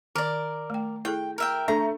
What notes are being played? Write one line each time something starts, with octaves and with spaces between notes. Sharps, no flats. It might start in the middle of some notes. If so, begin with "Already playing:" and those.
D#3 A#4 D5
A3 G5
E4 G#4 A4 G5
A#4 E5 G5
A3 D4 A#5